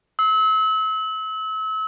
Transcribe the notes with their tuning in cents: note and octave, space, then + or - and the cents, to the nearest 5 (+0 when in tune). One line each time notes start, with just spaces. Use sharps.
E6 -35